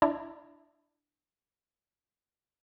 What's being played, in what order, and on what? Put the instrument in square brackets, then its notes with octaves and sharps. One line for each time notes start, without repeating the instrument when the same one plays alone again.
[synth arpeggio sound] D4 E4